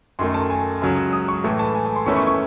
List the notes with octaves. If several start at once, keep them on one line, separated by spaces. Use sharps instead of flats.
F#2 D#3 A3 C6
A5
G#5
C#2 C#3 F#3
D#6
C#6
A2 E3 A3
A5
G#5
G#5
C6
E2 D#3 A3 C#4 E4 C#6
C#6
C#6